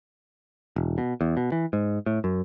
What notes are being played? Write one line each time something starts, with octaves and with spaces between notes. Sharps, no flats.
E1
B2
E2
B2
E3
G#2
A2
F#2